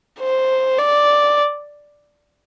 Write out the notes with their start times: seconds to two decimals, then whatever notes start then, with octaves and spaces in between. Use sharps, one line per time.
0.21 C5
0.79 D5